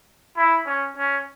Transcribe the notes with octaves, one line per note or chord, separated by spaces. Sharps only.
E4
C#4
C#4